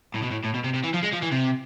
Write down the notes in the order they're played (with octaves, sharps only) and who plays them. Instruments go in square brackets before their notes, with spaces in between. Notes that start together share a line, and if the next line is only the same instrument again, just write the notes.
[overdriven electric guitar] A2
B2
A2
A2
B2
C3
C3
E3
F3
G#3
F3
E3
C3